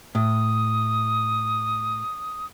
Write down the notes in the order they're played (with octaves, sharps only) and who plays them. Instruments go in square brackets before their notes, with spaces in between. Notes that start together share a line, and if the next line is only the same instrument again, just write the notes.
[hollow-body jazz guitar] A2 [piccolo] D#6